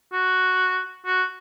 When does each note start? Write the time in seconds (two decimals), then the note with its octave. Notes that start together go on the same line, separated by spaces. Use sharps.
0.13 F#4
1.06 F#4